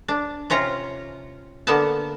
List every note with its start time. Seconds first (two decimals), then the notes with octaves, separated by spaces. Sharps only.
0.08 D4
0.50 C3 C#4 F4 A#5
1.67 D3 A#3 B3 E5 A5